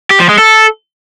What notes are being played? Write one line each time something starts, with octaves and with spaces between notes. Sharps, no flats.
G4
F3
G#3
A4